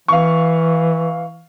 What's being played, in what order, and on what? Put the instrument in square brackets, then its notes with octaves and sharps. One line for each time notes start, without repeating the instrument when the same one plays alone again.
[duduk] E3 [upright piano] F5 C#6